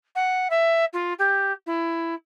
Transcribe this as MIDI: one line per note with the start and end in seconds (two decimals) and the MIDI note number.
0.15 0.48 78
0.50 0.85 76
0.93 1.13 65
1.19 1.52 67
1.66 2.15 64